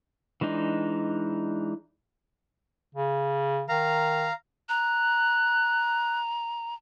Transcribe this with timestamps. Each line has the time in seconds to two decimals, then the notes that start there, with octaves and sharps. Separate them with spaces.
0.41 E3 G#3 D4 D#4
2.94 C#3
3.68 D#3 F5 A#5
4.69 A#5 F#6